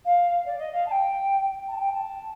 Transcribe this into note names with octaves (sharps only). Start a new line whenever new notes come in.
F5
D5
D#5
F5
A5
G5
A5
G5
A5